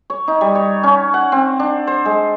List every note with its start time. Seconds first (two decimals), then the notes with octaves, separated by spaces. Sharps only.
0.10 C#5
0.28 D#4
0.41 G3
0.55 C#5
0.83 C#4
1.14 F#5
1.32 C4
1.59 D4
1.87 C5
2.05 G#3